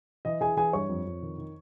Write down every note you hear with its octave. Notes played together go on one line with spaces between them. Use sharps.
E3 D#5
E3 G#4 G#5
E3 G#4 G#5
G2 C#5 C#6
F2
F2
D#3
D#3